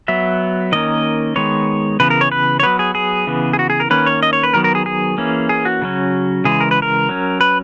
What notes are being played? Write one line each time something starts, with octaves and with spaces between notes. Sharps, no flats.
F#3 B3 E5
D#3 A#3 C#4 D#5
D#3 G#3 B3 C#5
C#3 E3 B3 B4
A#4
C#5
B4
C#5
F#3 B3 B4
G#4
G#4
C#3 E3 B3
G#4
F#4
G#4
A#4
D#3 A#3 C#4 B4
C#5
D#5
C#5
B4
D#3 F#3 B3 A#4
A#4
G#4
G#4
E3 A#3 C#4
G#4
F#4
C#3 F#3 C#4
C#3 E3 G#3 G#4
A#4
B4
A#4
F#3 C#4
B4